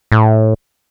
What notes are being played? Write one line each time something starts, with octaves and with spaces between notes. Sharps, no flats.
A2